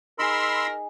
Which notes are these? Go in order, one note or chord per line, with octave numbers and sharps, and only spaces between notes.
D#4 G#4 A#4 B5 C6 E6